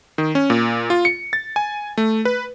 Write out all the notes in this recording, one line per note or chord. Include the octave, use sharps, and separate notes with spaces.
D#3
C#4
A#2
F4
C#7
A6
G#5
A3
B4